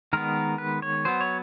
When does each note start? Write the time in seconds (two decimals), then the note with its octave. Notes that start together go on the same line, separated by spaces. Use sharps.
0.13 D#3 G#3 B3 A#4
0.58 B4
0.82 C#5
1.05 F#3 B3 C5
1.21 C#5